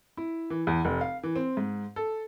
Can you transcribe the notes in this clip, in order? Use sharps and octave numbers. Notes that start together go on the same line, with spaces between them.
E4
E3
E2
F1
F5
E3
C4
G#2
A4